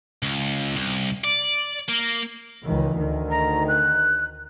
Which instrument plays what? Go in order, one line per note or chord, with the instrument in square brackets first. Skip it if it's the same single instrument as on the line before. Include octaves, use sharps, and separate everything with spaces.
[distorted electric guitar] C#2
C2
D5
A#3
[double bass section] C#2 D#3 E3
D2 D#3
[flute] A#5
F#6